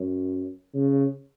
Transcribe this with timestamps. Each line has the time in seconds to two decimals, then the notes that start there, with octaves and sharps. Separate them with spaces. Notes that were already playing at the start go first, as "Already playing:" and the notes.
Already playing: F#2
0.74 C#3